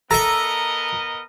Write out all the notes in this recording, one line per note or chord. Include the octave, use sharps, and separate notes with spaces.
B3 A4 A#4 D#5 E5 A#5